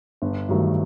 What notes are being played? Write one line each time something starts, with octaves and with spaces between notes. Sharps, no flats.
G1
G2 D#3 F#3 A3